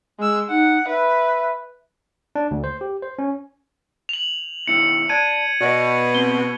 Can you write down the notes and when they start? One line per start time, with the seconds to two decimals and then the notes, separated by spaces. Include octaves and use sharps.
0.19 G#3 E6
0.50 D#4 F#5
0.88 B4 E5
2.35 D4
2.51 D2
2.64 C5
2.81 G4
3.03 C5
3.19 C#4
4.09 F7 F#7
4.67 B2 D#3 E4 C#7
5.09 D5 A5 G#6 D#7
5.61 B2 D5 D#5
6.15 A#2 C4 G7